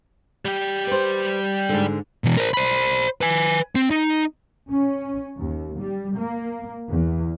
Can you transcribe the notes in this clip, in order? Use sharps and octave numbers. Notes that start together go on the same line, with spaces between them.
G3 G4
B4 C5
G#2 D3
B2 E3
A#4 C5
C5 B5
B4 G#5
C4
D#4
C#4
D#2
G3
A#3
E2